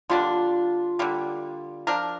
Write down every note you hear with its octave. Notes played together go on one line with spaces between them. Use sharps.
D3 G3 A#3 D4 F4
D3 G3 A#3
F3 D4 A#4